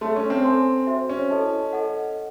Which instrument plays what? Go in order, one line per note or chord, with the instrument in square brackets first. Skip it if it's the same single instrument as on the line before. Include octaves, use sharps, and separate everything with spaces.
[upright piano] A3 [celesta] C#5 E5 A5 C6
[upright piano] C#4
C4
[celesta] A4 C#5 G#5 C6
F#4 C5 E5 C6
[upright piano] C#4
[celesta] E4 A4 D#5 A5
A4 D#5 F#5